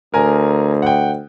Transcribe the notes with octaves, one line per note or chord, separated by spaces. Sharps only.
D2 A#4 G#5 A#5
F#5 G5